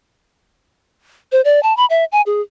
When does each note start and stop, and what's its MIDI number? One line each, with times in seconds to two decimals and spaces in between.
1.32 1.41 72
1.45 1.62 74
1.63 1.75 81
1.77 1.86 83
1.90 2.05 76
2.12 2.22 80
2.26 2.41 68